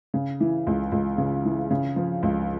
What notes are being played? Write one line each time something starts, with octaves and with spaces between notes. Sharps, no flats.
C#3
E3
C#2
C#2
C#3
E3
C#3
F3
C#2